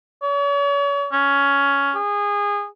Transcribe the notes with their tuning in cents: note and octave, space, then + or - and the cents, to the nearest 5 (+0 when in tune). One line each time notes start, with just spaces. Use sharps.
C#5 +40
C#4 +10
G#4 -25